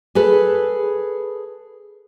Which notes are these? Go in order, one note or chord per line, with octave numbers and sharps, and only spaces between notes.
G#4 A4 B4